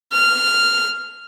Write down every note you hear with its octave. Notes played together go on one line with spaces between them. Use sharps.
F6